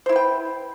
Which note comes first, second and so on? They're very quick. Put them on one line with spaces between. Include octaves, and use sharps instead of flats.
C5 E4 B4 G5